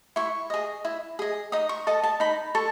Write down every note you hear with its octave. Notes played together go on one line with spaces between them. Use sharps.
E4 C#6
G#4 D#5
E4
G#4 D#5
D#4 D#6
C#6
A4 D#5 A5
A5
D#4 B5
A4 C#6